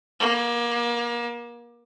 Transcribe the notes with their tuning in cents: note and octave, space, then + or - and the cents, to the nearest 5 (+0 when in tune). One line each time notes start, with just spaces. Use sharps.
A#3 +30